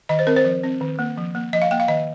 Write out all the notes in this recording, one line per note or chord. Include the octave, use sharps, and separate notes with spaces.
D#3 D#5
C5
C4 A#4
C5
F3
C4
D#3
A#3
F3
A#3
F3 D#5
F5
A#3 G5
F5
D#3 D#5